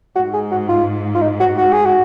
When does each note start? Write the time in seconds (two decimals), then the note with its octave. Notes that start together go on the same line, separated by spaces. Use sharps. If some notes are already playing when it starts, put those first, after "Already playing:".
0.16 G#2 F#4
0.34 G#4
0.51 F#4
0.69 F4
1.15 F4
1.22 D#4
1.40 F#4
1.58 F#4
1.73 G#4
1.86 F#4